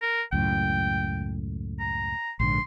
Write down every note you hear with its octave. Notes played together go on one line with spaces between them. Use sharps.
A#4
C#2 F#2 A2 G5
A#5
A#1 G#2 D3 C6